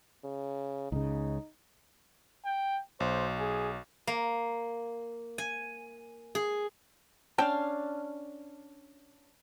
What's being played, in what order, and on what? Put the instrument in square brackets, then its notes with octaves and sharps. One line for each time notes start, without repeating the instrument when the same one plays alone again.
[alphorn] C#3
[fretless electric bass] C#2 C#3 [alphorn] D#4
[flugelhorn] G5
[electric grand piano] B1 [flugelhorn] C5
[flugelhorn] G#4
[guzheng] A#3
G#5
G#4
[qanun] C#4 D4 F5 [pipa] G5 A5